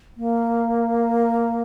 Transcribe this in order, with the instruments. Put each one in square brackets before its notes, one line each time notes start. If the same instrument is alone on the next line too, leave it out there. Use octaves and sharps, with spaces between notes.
[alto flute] A#3